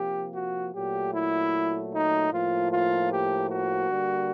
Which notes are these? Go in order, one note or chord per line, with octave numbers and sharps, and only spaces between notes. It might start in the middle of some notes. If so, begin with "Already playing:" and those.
Already playing: C3 F3 A#3 G4
F#4
A#2 F#3 A3 G4
E4
D#4
A2 F3 A#3 F4
F4
G4
F#4
D3 G3 A#3